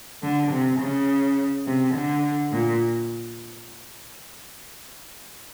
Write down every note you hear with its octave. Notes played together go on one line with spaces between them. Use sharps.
D3
C3
C#3
C3
D3
A#2